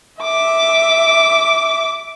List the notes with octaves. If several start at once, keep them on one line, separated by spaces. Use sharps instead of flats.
E5 D6